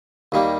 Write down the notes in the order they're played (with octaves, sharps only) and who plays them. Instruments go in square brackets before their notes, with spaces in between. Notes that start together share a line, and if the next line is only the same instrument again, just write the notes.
[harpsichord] D#2 D#3 G3 A#3